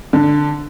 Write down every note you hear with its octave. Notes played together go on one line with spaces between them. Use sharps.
D3